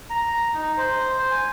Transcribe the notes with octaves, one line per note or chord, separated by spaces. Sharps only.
A#5
D#4
C5
G#5